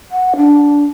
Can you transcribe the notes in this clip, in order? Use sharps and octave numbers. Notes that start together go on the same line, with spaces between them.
F#5
D4